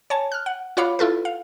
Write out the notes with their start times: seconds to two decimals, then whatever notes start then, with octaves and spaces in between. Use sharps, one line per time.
0.10 C#5 G#5 A5
0.32 F6 F#6
0.46 F#5
0.77 F4 F#4 C#5 F5 B5 D6
0.99 E4 F4 A4 B4
1.25 F5